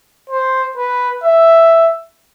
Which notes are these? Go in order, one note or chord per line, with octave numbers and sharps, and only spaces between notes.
C5
B4
E5